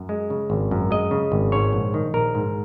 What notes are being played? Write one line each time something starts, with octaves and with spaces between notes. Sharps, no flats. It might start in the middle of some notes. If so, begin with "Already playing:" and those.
Already playing: F#2
G#3
C#3
G#1
F#2
G#3 D#5
C#3
G#1
G#2 C#5
A#1
D#3
A#1 A#4
G#2